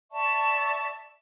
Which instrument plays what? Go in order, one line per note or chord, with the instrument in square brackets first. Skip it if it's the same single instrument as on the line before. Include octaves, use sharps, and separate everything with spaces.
[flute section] D5 E5 A5 C#6